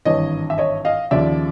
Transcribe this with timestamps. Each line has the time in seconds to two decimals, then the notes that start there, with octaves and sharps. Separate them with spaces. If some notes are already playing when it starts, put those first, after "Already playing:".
0.05 G#1 G2 E3 C#5 D#5
0.50 E5
0.58 C#5 D#5
0.85 D#5 F5
1.11 D#2 C#3 F3 D5 E5